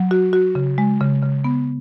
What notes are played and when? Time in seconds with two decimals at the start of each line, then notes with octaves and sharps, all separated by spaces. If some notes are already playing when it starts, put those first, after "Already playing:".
Already playing: F#3
0.11 F#4
0.33 F#4
0.55 C#3
0.78 G#3
1.01 C#3
1.22 C#3
1.44 B3